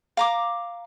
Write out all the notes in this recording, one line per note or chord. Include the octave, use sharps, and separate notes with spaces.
F5 A#5 D6